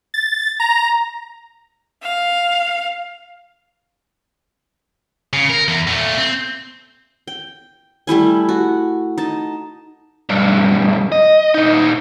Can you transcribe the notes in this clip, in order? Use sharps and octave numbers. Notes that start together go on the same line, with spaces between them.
A6
A#5
F5
C#3
A#4
E2
A#2 A3
C4
G5
G3 A3 E4 G#5
F#4
D#4 A5
B1 G2
D#5
A#2 D#4